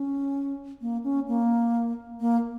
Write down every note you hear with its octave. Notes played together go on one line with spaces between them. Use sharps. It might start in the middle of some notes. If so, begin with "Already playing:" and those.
Already playing: C#4
A#3
C#4
A#3
A#3